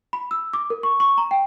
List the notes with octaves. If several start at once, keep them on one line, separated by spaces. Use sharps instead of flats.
B5
E6
D6
A#4
C#6
C#6
A#5
G5